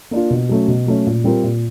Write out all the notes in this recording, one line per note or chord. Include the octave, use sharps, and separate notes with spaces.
A#3 D4 F4
B2
F#3 A3 C#4
B2
F#3 A3 C#4
A#2
G3 C4 F4 A#4
A#2